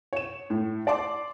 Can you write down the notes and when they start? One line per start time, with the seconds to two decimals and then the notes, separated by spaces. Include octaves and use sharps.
0.13 C#5 E7
0.50 A2
0.87 D5 A5 C6 D6